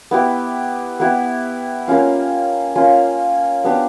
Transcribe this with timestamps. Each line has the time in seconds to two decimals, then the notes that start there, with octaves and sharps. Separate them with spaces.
0.11 B3 E4 G4
1.00 B3 E4 G4
1.88 A#3 C#4 F4
2.76 A#3 C#4 F4
3.64 B3 D4 G4